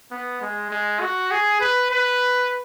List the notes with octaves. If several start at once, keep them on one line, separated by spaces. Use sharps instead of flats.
B3
G#3
G#3
F#4
G#4
B4
B4